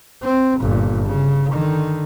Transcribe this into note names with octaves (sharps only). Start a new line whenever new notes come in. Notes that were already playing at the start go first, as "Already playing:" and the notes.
C4
G1 A#2
C#3
D3 D#3